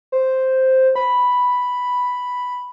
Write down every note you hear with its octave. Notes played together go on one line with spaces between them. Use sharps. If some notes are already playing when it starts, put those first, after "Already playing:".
C5
B5